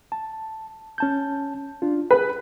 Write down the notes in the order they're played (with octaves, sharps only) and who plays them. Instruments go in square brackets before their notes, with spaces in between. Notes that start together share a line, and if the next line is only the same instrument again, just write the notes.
[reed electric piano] A5
C#4 A5 G6
D4 F4
[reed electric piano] G#4 [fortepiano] B4